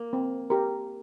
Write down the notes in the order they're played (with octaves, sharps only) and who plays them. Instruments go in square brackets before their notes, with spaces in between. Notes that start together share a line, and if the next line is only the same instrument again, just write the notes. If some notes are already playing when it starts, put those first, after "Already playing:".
Already playing: [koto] A#3
[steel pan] C4
G4 A#4